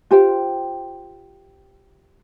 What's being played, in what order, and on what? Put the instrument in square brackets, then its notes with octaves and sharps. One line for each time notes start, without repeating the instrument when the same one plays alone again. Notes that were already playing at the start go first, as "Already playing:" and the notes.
[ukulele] F4 G4 C5 G5